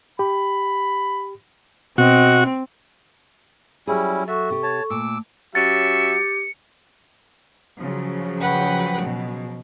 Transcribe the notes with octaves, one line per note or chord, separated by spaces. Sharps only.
G4 B5
B2 C4 F#4 D#5
F#3 G3 C#4 E4 G#4
F#4 A4 E5 C#6
C3 G4
C#5 A5
A#2 A3 D6 E6
F#3 C#4 G4 E5 A6 C#7
C#3 F3 F#3
B4 F#5 G5
B2